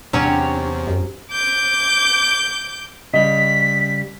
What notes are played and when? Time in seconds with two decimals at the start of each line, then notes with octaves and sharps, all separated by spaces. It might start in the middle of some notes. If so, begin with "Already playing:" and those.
0.13 E2 C3 F#3 C#4 D4 C#5
0.87 F#2
1.31 D6 G6
3.14 C#3 G3 D#5 B6